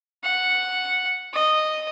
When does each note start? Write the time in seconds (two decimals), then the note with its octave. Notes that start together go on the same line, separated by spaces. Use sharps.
0.24 F#5
1.34 D#5